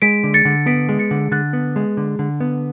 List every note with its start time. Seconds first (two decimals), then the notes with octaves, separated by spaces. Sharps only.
0.02 G#3 B6 D7
0.24 D3
0.34 A6 C#7
0.45 D3
0.66 B3 B6 D7
0.89 G#3
0.99 A6 C#7
1.11 D3
1.31 D3 F#6 A6
1.53 B3
1.76 G#3
1.97 D3
2.19 D3
2.41 B3